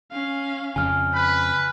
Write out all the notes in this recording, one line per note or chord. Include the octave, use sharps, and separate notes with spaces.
C#4 F5
F2 C#3 G#5 F6
B4 B5